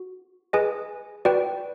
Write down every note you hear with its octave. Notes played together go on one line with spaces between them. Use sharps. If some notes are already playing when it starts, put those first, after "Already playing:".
Already playing: F#4
G#4 B4 D#5 G#5
F#4 B4 D5 G5